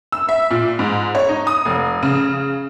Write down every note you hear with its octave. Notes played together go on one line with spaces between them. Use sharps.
E6
E5
A#2
G#2
C#5
D#4
D#6
F1
C#3